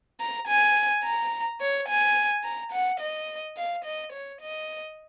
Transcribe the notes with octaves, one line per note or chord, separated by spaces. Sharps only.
A#5
G#5
A#5
C#5
G#5
A#5
F#5
D#5
F5
D#5
C#5
D#5